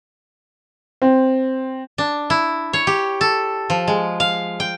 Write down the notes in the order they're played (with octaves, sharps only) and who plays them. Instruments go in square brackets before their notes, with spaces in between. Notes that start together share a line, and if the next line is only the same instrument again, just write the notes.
[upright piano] C4
[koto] D4
E4
C#5
G4
A4
F3
G#3
F5
G5